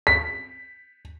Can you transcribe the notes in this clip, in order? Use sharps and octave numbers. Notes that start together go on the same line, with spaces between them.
B6